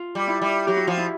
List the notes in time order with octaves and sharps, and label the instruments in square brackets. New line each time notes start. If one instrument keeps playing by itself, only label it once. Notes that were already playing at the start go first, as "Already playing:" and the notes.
Already playing: [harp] F4
[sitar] G3
[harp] E4
[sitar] G3
[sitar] F#3 [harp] G4
[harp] F#4
[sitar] F3 [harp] F4
[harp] E4